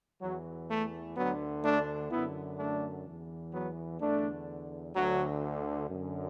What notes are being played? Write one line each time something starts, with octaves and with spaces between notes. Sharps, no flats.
E2 E3 F#3
A3
D2 D3 F#3 B3
A3 D4
F#2 D3 B3 E4
A3 D4
E2 E3
F#3 B3
E2 D3 A3 D4
D2 D3 F#3
F#2 D3